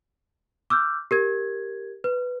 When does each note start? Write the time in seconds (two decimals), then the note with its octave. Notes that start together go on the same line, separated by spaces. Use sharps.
0.70 D6 E6 F6 G6
1.11 G4 A#4 G#6
2.04 B4